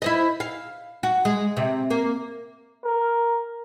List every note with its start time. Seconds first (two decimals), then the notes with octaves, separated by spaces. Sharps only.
0.02 E4 C5 D#5
0.40 F5
1.03 F#4
1.25 G#3
1.57 C3
1.90 A#3
2.84 A#4